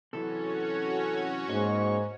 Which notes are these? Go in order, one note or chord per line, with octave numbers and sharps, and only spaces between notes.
C3 E3 F#3 C#4 F#4 A4 C#5
G#2 A#3 C#4 C#6